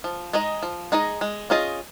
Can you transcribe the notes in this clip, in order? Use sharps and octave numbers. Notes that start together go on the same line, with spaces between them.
F3
G#3 D#4 G#4 D#5
F3
G#3 D#4 G#4 D#5
G#3
C#4 F4 G#4 D#5